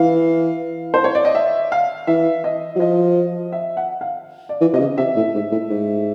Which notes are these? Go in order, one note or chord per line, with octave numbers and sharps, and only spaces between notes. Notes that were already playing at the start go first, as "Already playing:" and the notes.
Already playing: E3 F5
C5
C#5
D5
D#5
E5
F5
E3 E5
D#5
F#3
F3 D#5
E5
F#5
F5
D5
E3
C3 D#5
C#3
C3 E5
A2
G#2
A2
G#2